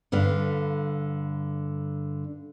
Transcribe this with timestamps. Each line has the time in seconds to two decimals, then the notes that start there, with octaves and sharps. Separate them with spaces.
0.12 G2 D3 B4 F5